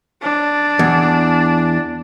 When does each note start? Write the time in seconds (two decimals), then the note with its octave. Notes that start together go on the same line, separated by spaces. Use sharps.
0.22 D4
0.79 E2